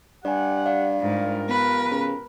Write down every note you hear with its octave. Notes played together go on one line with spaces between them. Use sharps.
G2 G4 D5 F#5 G#5
D5 F5
G#2 F4 G4 A#4
B3 B4
C#3